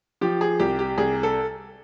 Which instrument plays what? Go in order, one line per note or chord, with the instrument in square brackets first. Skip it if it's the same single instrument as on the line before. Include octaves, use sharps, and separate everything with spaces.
[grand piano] F3 G4
G#4
C2 G4
G4
C2 G#4
A4